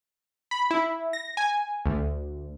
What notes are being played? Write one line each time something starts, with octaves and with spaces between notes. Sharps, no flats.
B5
E4
A#6
G#5
D2